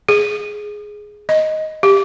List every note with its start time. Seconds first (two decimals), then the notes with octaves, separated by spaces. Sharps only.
0.09 G#4
1.29 D#5
1.83 G4